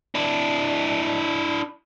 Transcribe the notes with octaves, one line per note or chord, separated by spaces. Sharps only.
D4 E4